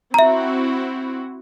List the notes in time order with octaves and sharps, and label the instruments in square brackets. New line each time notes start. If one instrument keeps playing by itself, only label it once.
[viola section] C4 E4 F#4 [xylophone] E5 A#5